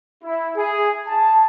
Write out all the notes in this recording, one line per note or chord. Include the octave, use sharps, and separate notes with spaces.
E4
G#4
A5